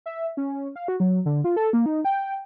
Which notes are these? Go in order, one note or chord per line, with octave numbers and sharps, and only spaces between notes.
E5
C#4
F5
F#4
F#3
D3
F4
A4
A#3
D#4
G5